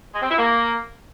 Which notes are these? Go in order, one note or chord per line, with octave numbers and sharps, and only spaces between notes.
G#3
C4
E4
A#3